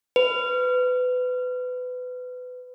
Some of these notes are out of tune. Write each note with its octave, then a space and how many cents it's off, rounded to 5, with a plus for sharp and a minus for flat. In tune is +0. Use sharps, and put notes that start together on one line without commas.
B4 +25